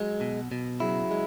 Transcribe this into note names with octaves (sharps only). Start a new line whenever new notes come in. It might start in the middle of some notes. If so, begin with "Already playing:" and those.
Already playing: F#3 G#3
B2
B2
C#3 F#3 E4
G#3